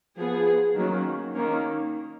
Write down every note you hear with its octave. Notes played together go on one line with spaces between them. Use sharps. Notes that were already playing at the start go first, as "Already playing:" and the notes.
F3 B3 G#4
D#3 F#3 A#3 C#4
D#3 A#3 C#4